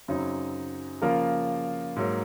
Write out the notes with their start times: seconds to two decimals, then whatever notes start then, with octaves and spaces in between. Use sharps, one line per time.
0.08 F#2 C#3 F#3 C4 D#4
1.02 C#3 F3 A#3 F4 A#4
1.96 G#2 F#3 A#3